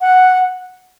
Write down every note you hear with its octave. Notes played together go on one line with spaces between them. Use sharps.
F#5